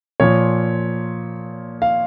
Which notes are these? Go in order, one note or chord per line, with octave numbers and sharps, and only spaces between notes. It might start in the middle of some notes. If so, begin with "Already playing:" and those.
A#2 F3 C#5
F5